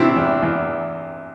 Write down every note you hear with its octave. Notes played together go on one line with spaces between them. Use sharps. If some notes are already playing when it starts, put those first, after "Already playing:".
Already playing: E2 C3 C4 D4 E4 F#4
E2
E2